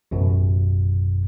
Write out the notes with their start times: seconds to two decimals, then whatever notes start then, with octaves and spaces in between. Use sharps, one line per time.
0.11 A1 F#2 B2